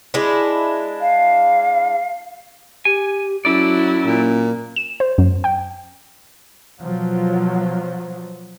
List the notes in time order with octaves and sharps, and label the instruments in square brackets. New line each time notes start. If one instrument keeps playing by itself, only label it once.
[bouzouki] G#3 D4 E4
[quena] F5
[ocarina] G4 [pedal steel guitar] G#5
[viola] F#3 E4 [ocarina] C#4 [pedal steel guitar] A4 D5
[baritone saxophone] A#2
[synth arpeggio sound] E7
C5
F#2
G5
[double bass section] B2 F3 F#3